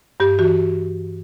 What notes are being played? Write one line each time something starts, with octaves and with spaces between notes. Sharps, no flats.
G2 G4
E3 F#4